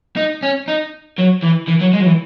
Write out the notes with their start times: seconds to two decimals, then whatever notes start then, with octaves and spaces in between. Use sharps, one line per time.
0.16 D#4
0.43 C#4
0.68 D#4
1.18 F#3
1.43 E3
1.68 E3
1.81 F#3
1.93 G#3
2.00 F#3
2.06 E3